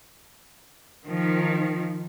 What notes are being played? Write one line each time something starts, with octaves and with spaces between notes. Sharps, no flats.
D#3 F3